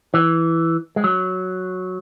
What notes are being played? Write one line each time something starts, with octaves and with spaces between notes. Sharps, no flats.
E3
G#3
F#3